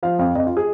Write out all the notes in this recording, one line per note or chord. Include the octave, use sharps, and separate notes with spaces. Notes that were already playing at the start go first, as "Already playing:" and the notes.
F3 F5
F2 F5
F2 D#5
F4
G#4